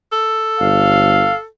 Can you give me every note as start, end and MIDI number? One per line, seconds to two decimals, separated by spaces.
0.12 1.46 69
0.60 1.29 31
0.60 1.36 77